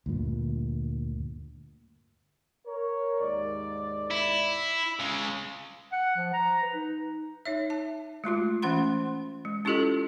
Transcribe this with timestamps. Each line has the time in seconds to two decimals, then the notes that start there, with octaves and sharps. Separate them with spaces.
0.06 D2 G2 A#2
2.67 A#4 C#5
3.20 D#2 G#2 D5
4.11 E4
4.99 C#3 G#3
5.92 F#5
6.16 F3
6.33 A#5
6.63 B4
6.74 D#4
7.45 D#4 C#5 E5
7.70 A5
8.24 G#3 A3 F4 F#4
8.62 E3 A3 C#4 F#5 B5 C6
9.45 G#3
9.65 C#4 E4 F4 G4 A4 D#5